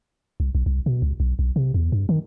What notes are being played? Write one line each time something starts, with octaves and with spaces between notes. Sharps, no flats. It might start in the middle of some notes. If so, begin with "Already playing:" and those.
C2
B1
C2
B2
C#2
B1
B1
C3
E2
G2
D#3